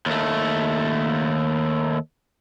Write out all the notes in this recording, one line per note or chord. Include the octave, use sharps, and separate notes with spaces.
D#2 A3